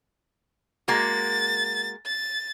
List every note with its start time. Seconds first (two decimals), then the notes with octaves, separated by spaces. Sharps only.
0.88 G#3 A#3 F#4 A6
2.05 A6